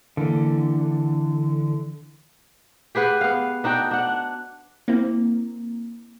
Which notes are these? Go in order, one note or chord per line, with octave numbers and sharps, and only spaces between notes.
D3 E3 A#3
G4 G#4 B4 F#5
B3 F5
D4 D#4 F#4 G5
D4 F#5
A#3 C4 E4